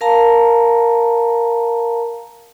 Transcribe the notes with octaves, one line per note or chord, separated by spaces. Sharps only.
A#4 F5 A5 A#5